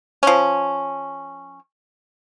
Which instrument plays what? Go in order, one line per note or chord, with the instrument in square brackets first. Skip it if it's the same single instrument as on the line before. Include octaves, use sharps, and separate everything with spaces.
[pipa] F3 C#4